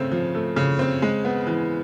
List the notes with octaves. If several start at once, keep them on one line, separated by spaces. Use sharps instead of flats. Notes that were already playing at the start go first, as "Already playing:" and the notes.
Already playing: C#3 A3 C4
F3
A3
C#3
C4
G#3
B3
E3